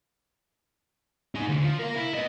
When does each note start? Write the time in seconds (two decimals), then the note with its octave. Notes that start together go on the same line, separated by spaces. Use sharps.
1.35 D#4 G#4
1.49 D2 D3
1.64 F3
1.80 A#4 F5
1.97 E4
2.15 B3 D#5